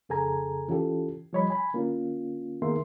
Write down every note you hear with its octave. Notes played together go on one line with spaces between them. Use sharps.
F2 C#3 G#4 A4 G#5 A#5
E3 C#4 F4 G4 A4
F3 G3 C#5 D#5 B5
G#5 B5
D3 A#3 C#4 F4
D#3 A#3 B3 G#4 E5 C6